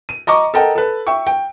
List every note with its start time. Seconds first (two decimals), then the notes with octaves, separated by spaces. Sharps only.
0.09 D#7
0.27 D#5 A#5 C#6 D6
0.54 A4 A#4 D#5 F#5 G5 A#5
0.75 A4 B4
1.07 E5 G5 C#6
1.27 G5